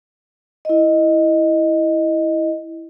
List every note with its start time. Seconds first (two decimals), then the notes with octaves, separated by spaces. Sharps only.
0.65 E4 D#5